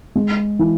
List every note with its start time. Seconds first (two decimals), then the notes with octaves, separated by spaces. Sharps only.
0.16 G#3
0.59 E3